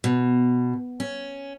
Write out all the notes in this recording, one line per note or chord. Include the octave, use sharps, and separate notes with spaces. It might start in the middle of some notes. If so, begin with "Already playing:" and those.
B2
C#4